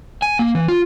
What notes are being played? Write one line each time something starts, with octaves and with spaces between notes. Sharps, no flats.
G#5
A#3
E3
F4